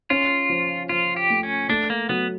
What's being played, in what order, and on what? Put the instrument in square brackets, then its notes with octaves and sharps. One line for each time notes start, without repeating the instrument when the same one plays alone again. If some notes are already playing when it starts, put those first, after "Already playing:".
[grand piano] C#4 [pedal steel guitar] F4
[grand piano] F3
[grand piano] F3 [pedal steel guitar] F4
[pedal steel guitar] G4
[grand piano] A3
[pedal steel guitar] C#4
[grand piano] A3 [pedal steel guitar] D4
[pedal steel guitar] A#3
[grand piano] F#3 [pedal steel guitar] B3